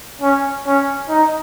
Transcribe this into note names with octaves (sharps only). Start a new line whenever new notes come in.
C#4
C#4
D#4